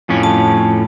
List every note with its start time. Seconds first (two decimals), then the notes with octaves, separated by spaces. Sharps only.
0.09 F2 A2 C#4
0.23 A5